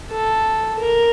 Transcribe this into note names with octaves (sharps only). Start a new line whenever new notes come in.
A4
A#4